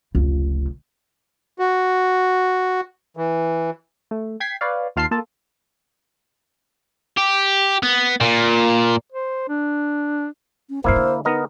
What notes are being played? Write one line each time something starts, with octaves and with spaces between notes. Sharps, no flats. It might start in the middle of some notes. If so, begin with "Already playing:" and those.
F1 C#2
F#4
E3
A3
G5 G#6 B6 C7
B4 C#5 D5 F5
D#2 F4 F5 A5 C6 C7
A#3 F4 A4 A5
G4
B3
A#2
C5
D4
C#4
G2 C3 A#3 E4 C5 F5
D3
B3 D#4 A#4 D#5